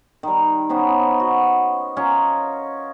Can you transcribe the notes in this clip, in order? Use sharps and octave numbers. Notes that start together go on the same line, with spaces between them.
D#3 G3
B3 C#4 D#4 C5
F#4
C#4 F4 A#4 D#5